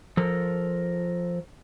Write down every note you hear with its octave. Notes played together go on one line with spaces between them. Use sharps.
F3 A4 A#4